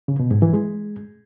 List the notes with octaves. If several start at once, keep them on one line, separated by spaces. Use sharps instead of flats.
C#3
B2
G#2
E3
G#3